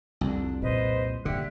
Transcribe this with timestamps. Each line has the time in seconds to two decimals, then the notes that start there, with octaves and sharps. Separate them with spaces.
0.21 C2 F2 D4
0.62 A#2 B4 C5 D#5
1.25 G2 D3 A#3 G4 E5 F#6